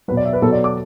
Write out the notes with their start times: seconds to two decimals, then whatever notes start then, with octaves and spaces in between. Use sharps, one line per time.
0.08 F#3 B4
0.12 B2
0.17 D5
0.25 E5
0.33 B4
0.42 B2 F#3 A4
0.52 D5
0.64 D6